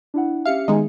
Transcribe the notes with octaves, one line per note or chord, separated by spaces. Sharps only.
D4 E4 F#5
C#4 G4 E5 F5 C#7
D#3 G#3 B3 D#4 G#4